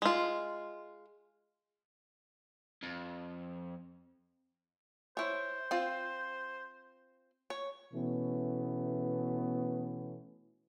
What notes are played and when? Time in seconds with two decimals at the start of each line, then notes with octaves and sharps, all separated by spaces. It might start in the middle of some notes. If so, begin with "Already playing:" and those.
0.02 G#3 F4
2.83 F2
5.17 E4 C5 C#5
5.71 C4 F4
7.50 C#5
7.93 B2 E3 A3 B3 C#4